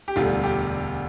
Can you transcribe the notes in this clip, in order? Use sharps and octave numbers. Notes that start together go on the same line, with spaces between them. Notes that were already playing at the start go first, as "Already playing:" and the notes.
G4
E1 D2 D3 G3 F4
G4